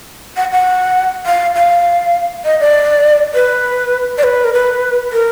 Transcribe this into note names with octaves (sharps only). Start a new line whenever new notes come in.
F#5
F#5
F5
F5
D#5
D5
B4
D5
B4
A#4
B4
A#4